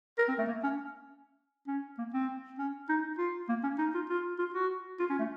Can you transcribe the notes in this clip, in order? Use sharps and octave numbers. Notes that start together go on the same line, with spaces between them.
A#4
C4
A3
A#3
C#4
C#4
A#3
C4
C#4
D#4
F4
A#3
C#4
D#4
F4
F4
F4
F#4
F4
C#4
A3